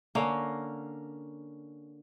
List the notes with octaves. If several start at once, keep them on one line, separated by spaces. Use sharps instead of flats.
D3 A#3 C#4